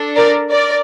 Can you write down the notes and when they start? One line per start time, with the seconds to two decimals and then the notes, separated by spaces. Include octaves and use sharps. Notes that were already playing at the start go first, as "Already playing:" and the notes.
Already playing: D4 A4
0.16 A#4 D5
0.51 A#4 D5